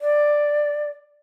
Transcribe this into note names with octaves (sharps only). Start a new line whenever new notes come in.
D5